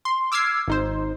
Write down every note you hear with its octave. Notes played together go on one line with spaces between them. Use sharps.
C6
D6 E6 F6 G#6 C7
G#1 D#4 C5